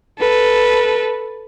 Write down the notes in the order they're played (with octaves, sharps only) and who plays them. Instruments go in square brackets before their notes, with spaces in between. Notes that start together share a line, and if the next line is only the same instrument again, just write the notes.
[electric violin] A4 B4